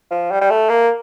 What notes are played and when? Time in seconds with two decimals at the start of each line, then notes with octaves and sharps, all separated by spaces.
0.11 F3
0.31 G3
0.41 G3
0.50 A3
0.70 A#3